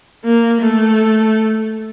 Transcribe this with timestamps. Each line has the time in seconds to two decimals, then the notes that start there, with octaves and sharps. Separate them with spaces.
0.24 A#3
0.61 A3